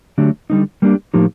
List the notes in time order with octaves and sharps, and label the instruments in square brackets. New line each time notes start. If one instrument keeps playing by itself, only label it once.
[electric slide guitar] D3 F#3 A3 D4 G4
D3 G3 A#3 D#4
G3 A#3 D4 G4
A2 F3 A#3 D#4 G4